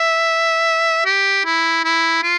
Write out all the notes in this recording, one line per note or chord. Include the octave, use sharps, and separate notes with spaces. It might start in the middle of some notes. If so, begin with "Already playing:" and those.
Already playing: E5
G4
E4
E4
F4